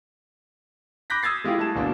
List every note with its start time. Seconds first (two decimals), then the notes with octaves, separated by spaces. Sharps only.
1.10 B5 D6 F#6 G6 A#6 B6
1.23 D#6 E6 G#6 A6 C7
1.44 G#3 E4 F4 G4 G#4
1.57 G3 A3 E4 G#4 A5 E7
1.75 G1 D2 B2 A#3 D4